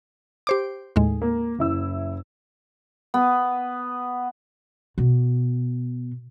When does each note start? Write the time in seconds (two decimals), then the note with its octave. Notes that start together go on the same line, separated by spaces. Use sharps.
0.47 G4 C5 D6
0.96 D#2 A2 G#3
1.22 A#3
1.59 F#1 E4 E6
3.14 B3
4.98 B2